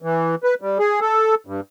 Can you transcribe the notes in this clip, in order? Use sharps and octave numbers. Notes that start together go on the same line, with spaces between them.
E3
B4
G3
G#4
A4
G2